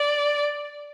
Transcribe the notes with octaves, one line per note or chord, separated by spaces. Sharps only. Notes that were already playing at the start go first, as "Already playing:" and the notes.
Already playing: D5